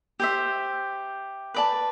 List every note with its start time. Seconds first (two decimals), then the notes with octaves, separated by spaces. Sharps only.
0.20 G4 C5 E5
1.54 B4 D5 A5